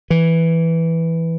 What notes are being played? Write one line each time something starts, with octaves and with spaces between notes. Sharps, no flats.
E3